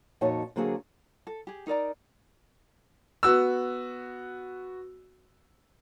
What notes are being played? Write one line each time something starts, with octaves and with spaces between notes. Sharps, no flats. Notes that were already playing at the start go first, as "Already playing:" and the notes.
F2 A#2 D#4 F#4 C#5 A5
D3 F#3 A#3 C4 F#4 G#4
A4
G4 G#4
D#4 A#4 D5 A#5
B3 F#4 E6